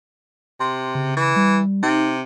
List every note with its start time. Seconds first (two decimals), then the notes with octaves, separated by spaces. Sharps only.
0.60 C3 C6
0.95 C#3
1.17 E3
1.36 G3
1.83 C3 D#4